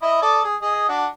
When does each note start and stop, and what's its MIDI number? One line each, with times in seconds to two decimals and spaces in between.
0.02 0.18 64
0.02 0.18 75
0.02 0.18 76
0.22 0.41 69
0.22 0.41 74
0.22 0.41 87
0.45 0.55 68
0.62 0.86 68
0.62 0.86 75
0.89 1.06 62
0.89 1.06 66